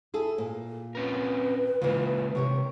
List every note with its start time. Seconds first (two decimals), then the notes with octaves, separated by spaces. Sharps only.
0.14 E4 G#4 A4
0.38 A#2
0.95 C4 C#4 A#4 B4
1.82 C#3 E3 G#3 A#3 F4
2.35 C3 G4 A#4 C#5